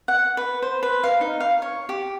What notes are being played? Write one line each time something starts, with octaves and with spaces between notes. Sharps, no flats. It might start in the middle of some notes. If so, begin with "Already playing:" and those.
F#5
B4
C5
B4
F5
D#4
F5
C#5
G4